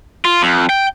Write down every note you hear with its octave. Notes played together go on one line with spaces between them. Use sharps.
F4
F2
G5